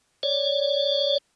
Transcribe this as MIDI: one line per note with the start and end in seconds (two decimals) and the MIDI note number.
0.23 1.18 73
0.23 1.18 74